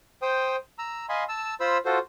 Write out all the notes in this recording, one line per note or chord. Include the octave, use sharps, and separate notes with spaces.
C5 G5 D#6
A#5 E6
D#5 F5 G#5 B5 C6
A5 E6
F4 C5 B5 E6
F4 F#4 A4 C5